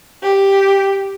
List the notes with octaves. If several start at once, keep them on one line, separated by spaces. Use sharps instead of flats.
G4